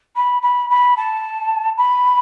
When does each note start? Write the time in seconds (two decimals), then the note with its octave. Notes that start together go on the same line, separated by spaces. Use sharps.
0.16 B5
0.42 B5
0.69 B5
0.96 A5
1.77 B5